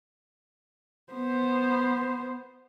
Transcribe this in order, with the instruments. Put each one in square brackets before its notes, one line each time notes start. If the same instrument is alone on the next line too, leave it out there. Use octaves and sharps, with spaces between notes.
[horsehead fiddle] B3 C5